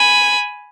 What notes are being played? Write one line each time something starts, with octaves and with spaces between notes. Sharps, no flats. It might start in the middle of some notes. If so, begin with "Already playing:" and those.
Already playing: G#5 B5